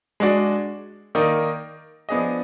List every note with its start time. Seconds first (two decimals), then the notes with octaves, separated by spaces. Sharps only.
0.20 G#3 D4 F#4 D5
1.15 D#3 A#3 D#4 A#4 D5
2.09 F3 B3 D4 G#4 D#5